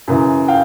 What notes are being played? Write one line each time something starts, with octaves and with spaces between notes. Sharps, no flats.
F#2 C#3 E3
F5 G5